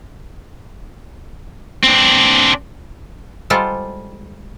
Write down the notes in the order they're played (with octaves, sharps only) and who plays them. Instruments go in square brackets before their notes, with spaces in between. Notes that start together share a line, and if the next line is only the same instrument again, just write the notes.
[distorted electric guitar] C4 D4
[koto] G3 G#3 F4 A4 C5 D5